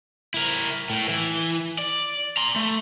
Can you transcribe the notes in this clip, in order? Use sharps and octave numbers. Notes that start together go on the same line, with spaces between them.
E4 A#4
A2
E3
D5
A#5 C6
A3